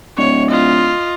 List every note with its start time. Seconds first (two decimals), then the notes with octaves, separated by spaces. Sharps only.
0.18 D1 C#5
0.51 F4 D#5